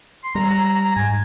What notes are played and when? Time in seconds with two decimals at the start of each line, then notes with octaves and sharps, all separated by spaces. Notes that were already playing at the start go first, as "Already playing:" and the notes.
0.24 C6
0.35 G3 A#5
0.50 A#5
0.66 A#5
0.81 A#5
0.96 G#2 G#5